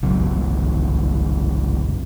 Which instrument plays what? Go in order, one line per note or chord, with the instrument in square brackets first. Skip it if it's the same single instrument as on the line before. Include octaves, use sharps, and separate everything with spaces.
[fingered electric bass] F#1 C2 C#3 F#3